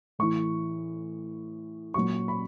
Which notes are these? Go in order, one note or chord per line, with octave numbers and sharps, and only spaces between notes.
A2 E3 C#6
A#2 F#3 C#6
B5